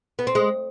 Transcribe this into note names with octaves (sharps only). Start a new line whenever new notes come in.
B3
C4
G#3